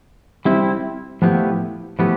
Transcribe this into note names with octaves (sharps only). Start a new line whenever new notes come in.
G3 C4 E4
A2 F3 B3 E4 G4
A2 F3 B3 E4 G4